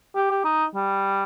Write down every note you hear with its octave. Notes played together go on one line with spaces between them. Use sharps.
G4
G4
D#4
G3